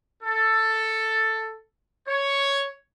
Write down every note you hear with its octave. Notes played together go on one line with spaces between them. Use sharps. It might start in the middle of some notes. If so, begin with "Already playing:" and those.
A4
C#5